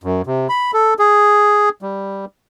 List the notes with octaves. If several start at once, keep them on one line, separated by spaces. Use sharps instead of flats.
F#2
C3
B5
A4
G#4
G3